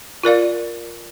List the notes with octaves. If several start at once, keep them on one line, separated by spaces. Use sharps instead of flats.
F4 A#4 D5 F5